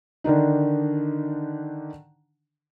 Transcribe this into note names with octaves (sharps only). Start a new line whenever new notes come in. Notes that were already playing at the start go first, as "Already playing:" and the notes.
D3 D#3 D4 D#4